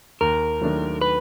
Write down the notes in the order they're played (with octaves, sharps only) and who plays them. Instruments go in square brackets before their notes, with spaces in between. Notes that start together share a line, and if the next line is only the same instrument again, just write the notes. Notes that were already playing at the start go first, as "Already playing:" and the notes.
[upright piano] D#2 [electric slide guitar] A#4
[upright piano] D#3 F#3 A3 D4
[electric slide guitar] B4